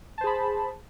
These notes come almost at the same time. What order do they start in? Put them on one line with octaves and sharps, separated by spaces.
A5 C5 G#4 B5